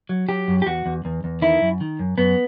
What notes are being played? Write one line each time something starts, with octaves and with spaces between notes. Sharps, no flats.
F#3
F#3 G4
F#2
G4
E2 F#4
E2
E2
E2
D#3 E4
F#2
D#3
F#2
F#2 B3